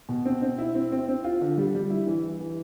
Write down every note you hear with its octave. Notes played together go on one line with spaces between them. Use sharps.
B2
C4
C4
E4
C4
C4
C4
F4
D3
G3
G3
E4
E3
E3
E3